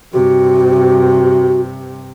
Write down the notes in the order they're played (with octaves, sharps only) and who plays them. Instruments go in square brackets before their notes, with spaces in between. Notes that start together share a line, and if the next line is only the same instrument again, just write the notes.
[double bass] G2 C3 [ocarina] F#4